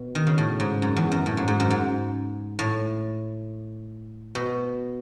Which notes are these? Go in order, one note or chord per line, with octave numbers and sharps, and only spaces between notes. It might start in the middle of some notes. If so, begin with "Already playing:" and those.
Already playing: B2
D#3
C#3
A2
G#2
F#2
E2
F#2
A2
G#2
G#2
F#2
G#2
A2
B2